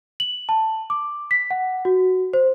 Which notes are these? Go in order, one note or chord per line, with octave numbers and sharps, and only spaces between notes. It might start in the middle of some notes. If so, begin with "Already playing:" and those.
F#7
A5
D6
B6
F#5
F#4
C5